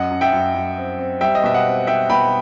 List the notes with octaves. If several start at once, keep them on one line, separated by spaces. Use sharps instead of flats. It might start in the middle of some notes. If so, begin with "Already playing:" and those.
Already playing: F#2 D#5 F#5
F#2
E5 G5
F#2
F#2
C4
C4
G3 E5 G5
D#5
B2 E5
D#5 F#5
C4
C4 E5 G5
B2 G5 B5